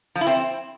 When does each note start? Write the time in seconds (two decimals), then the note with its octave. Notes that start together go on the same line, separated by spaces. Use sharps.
0.15 F3
0.21 E4
0.27 C4